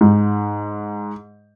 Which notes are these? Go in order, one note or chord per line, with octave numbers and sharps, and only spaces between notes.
G#2